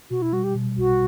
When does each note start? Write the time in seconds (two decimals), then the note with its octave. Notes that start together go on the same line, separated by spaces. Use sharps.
0.10 B2 F#4
0.22 E4
0.33 G3 F#4
0.44 G4
0.55 B2
0.77 B1 F#4